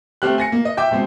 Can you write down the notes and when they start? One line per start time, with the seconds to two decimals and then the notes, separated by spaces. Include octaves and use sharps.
0.22 A3 C4 G4 F6 F#6
0.38 G#5 A#6 C#7
0.52 A#3
0.65 D#5
0.77 E5 G5 D6 G6
0.91 B2 G#3 C4